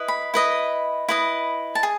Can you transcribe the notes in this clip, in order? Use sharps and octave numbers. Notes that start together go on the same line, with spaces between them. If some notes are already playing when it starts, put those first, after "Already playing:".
Already playing: E4 B4 D#5
B5
E4 B4 D#5
E4 B4 D#5
A5
G#4